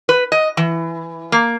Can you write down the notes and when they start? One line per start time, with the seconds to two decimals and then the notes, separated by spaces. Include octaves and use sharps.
0.09 B4
0.32 D#5
0.57 E3
1.32 A#3